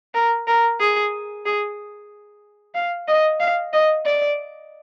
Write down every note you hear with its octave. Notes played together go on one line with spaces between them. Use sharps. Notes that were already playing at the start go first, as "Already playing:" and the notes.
A#4
A#4
G#4
G#4
F5
D#5
F5
D#5
D5